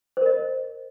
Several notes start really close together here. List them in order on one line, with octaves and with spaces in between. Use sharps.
C5 A#4 D#5